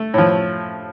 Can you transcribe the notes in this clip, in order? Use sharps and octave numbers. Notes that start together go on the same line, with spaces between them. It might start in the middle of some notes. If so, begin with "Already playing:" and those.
Already playing: A3
A2 F3